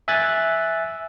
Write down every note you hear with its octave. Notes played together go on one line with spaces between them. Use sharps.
E5 G#5 F#6 A6